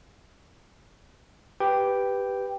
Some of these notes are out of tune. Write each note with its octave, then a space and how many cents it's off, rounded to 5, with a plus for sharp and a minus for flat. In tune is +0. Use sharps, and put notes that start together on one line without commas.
G4 +0 B4 +0 G5 +0